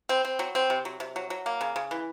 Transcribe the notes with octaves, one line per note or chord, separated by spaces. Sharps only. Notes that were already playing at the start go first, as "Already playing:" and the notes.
C4
C4
F#3
C4
C3
F#3
C3
F#3
F#3
A#3
C#3
C#3
E3